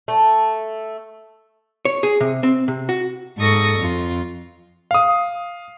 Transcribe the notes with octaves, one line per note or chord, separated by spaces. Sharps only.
A3
C#5
G#4
C3
C4
C3
F#4
G#2 A4 C#6 D#6 A#6
F2 F4
F5 D#6